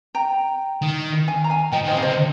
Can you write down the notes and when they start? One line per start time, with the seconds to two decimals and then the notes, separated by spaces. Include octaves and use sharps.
0.15 G5 A#5
0.82 D#3
1.28 F5 G#5
1.44 A#5
1.50 F5 G#5
1.72 F3 D#5 G5
1.84 D#3
1.88 A#2 C5 D#5
1.96 C3 F5
2.02 D3 C5 D#5
2.13 C5